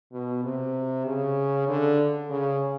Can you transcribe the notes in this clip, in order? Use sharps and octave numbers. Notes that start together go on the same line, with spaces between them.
B2
C3
C#3
D3
C#3